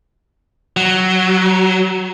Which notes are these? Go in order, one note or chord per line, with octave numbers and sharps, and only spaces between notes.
F#3